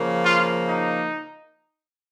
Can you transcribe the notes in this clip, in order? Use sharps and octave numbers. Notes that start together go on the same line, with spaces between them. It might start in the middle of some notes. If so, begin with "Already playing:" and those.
Already playing: C#3 F3 A#3
F4
D#4